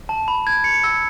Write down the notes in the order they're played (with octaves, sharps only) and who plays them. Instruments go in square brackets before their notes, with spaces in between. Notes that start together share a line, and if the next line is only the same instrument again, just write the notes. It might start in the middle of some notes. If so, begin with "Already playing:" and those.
[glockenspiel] A5
B5
G#6
C#7
E6